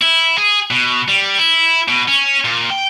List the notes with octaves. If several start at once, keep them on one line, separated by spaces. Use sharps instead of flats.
E4
G#4
B2
G3
E4
B2
C#4
A#2
G5